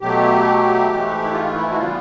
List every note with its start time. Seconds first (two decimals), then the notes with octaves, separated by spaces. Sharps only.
0.01 B2 F#3 A3 G4
0.89 G#2 E3 A3
1.22 E4
1.32 F4
1.55 E4
1.71 F#4
1.77 C#3 E3 G3 B3 F4